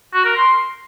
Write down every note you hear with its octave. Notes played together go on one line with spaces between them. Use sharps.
F#4
A#4
C6